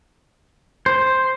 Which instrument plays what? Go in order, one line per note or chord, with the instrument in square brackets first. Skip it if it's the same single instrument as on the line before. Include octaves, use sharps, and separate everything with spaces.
[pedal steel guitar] C5